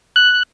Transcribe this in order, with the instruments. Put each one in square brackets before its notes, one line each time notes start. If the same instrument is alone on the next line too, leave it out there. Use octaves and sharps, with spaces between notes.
[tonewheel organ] F#6